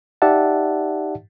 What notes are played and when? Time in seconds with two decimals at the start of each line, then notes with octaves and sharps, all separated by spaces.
0.22 D#4 G4 D5 E5 F#5 A5